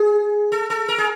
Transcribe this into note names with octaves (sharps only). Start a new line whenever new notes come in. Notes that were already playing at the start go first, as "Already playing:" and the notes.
Already playing: G#4
A4
A4
A#4
G#4